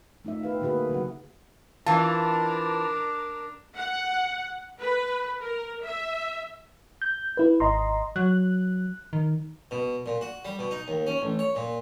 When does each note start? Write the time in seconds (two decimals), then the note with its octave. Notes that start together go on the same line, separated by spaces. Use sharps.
0.25 A3 D#4 F4 E5
0.43 G4 B4 F5
0.61 D3 A#3 F#4 G#4 B4 E5
0.90 C#3 F#3 F#4 F#5
1.86 E3 D4 F4 A#4 A5
3.77 F#5
4.81 B4
5.40 A#4
5.83 E5
7.02 G6
7.37 E4 B4
7.60 G#1 D#5 A#5 C6
8.16 F#3 F#6
9.13 D#3
9.71 B2
10.06 A#2
10.21 F#4
10.45 G3
10.59 B2
10.71 D#4
10.88 D#2
11.07 C#4
11.22 A1
11.39 C#5
11.56 A#2